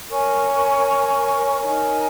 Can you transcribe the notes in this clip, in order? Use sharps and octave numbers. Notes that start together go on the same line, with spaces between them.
A#4 C#5 G#5 C#6
D#4 A#4 C#5 G#5